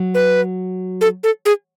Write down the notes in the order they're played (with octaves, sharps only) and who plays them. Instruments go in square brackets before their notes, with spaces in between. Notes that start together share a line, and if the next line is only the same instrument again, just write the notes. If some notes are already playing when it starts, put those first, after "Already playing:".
Already playing: [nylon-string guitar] F#3
[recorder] B4
A4
A4
G#4